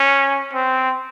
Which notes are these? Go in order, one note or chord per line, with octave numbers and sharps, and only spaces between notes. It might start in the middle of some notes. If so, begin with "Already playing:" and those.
Already playing: C#4
C4